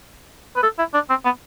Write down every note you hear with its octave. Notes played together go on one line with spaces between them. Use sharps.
B4
A4
E4
D4
C4
B3